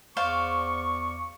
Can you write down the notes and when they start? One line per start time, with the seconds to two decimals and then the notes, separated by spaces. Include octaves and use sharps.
0.17 E2 C5 D5 F5 C#6